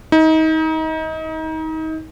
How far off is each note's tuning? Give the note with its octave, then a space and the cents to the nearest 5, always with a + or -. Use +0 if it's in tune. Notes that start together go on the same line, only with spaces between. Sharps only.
D#4 +30